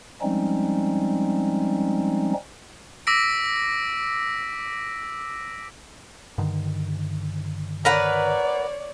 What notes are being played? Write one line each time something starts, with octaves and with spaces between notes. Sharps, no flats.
F3 G3 G#3 C4 C#4 D#4
D6 E6 A#6 B6 D7
G2 D3 D#3
A#4 B4 C#5 D5 F#5